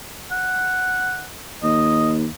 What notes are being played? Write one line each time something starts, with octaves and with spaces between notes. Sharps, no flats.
F#5
D#2 D#5